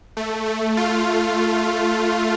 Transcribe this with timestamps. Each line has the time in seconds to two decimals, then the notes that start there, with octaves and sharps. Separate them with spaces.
0.17 A3
0.46 A3
0.77 F4